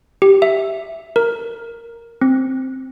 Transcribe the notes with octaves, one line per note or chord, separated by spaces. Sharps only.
G4
E5
A#4
C4